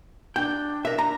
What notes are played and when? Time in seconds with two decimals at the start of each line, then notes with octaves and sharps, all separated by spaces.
0.36 D4 G5
0.85 A#4 E5
0.98 A#5